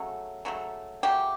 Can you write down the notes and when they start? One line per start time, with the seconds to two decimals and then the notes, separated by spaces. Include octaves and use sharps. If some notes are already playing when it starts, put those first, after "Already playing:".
Already playing: C#3 F#3 A3
0.45 C#3 F#3 A3
1.03 C#3 F#3 A3 G4